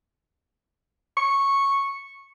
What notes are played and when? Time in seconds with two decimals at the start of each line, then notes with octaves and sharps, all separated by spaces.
1.17 C#6